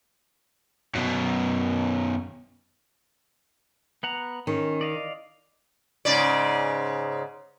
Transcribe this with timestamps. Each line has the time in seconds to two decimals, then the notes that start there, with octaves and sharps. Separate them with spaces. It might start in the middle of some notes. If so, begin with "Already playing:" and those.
0.95 F#2 B2
4.03 B3 F#5 A#5
4.47 D#3 C#4
4.81 D5 D#5 F5
6.05 G#2 C#3 D5